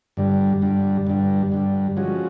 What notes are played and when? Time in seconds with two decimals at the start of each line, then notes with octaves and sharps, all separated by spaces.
0.17 G2 D3 G3
0.62 G2 D3 G3
1.07 G2 D3 G3
1.52 G2 D3 G3
1.96 F3 G#3 C#4 F#4